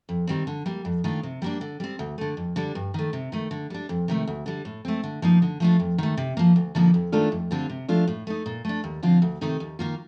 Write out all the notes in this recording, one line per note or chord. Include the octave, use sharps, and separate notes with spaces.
F2
D#3 G3 C4
D3
G3 A#3
F2
D#3 A3 D4 F4
C3
G3 A#3 D4
D3
G3 C4
D2
D3 A3
F2
D3 G3 D4
G2
D#3 A3
C3
D#3 A3
D3
G3 D4
F2
C3 D#3 A3
D2
D3 G3
A2
A3 C4
D3
F3 A#3 D#4
D3
F3 A3 D4 F4
F2
D#3 A3
C3
F3 A#3
D2
D3 F3 A#3 D#4
F2
D#3 A3 D4 F4
F2
D3 G3 C4 F4
C3
F3 A3 D4 F4
A2
A3 D#4
A#2
A3 D4
D#2
D3 F3 C4 F4
D2
C3 D#3 A3 D#4
D#2
D#3 A#3 F4